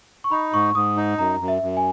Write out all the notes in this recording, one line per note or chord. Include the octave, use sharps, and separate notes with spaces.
C#6
D#4 B5
G#2 C#6
G#2 D#6
D#4
F#2 A#5
F#2
E5
F#2
G#5